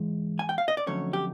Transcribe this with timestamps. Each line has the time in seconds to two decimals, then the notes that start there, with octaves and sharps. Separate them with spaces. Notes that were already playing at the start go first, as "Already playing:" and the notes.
Already playing: G#2 E3 G#3
0.39 G#5
0.49 G5
0.58 F5
0.68 D#5
0.77 D5
0.86 F2 D3 F#3 A3 C#4 C#5
1.13 G4